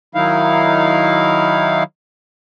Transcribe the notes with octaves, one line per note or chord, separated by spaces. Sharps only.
D#3 F#3 D#4 E4 F5